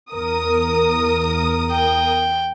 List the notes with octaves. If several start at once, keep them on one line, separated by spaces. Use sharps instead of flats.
E2 A#4 D#6
G5